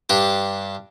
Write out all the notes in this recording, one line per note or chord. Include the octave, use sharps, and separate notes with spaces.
G2 D4 G4